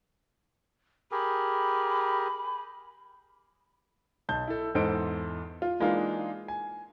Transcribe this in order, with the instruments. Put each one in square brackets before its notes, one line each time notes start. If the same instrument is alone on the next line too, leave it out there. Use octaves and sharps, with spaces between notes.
[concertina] G4 G#4 A#4 [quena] B5
[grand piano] B1 A5 G6
E4 A4
E2 G#2 A4 C5 D#5 D7
F4
E3 G#3 A#3 D4 D#4 F4
G#5